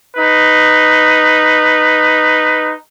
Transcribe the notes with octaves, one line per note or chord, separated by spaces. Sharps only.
D#4 B4